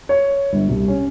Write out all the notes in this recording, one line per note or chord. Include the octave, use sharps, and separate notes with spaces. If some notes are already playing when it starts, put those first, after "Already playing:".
C#5
G1
C2
C#4